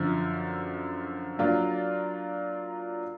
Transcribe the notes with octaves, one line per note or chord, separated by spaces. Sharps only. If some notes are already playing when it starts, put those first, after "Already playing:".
Already playing: F#2 D3 F3
F#3 A#3 D4 F4